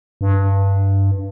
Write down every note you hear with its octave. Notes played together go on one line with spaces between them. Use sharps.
G2